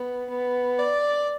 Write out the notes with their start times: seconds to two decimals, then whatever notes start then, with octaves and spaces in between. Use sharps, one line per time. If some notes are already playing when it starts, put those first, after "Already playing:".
Already playing: B3
0.30 B3
0.79 D5